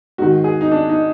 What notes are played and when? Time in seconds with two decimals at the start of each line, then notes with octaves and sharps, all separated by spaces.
0.18 G#2 D#3 F#4
0.44 G#4
0.61 D#4
0.71 D4
0.89 D#4